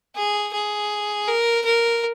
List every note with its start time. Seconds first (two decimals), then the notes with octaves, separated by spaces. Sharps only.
0.16 G#4
0.53 G#4
1.28 A#4
1.65 A#4